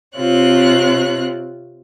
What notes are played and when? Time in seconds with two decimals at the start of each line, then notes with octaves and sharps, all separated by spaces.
0.16 C3 C4 F4 C#5 F#6